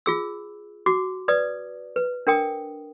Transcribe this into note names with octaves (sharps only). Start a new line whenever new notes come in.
F4 G#4 E6
F#4 D6
B4 D5 D#6
B4
D4 A#4 G5 D#6